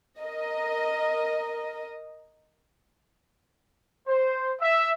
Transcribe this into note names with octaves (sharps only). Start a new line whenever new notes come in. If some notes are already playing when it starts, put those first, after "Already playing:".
A#4 D#5
C5
E5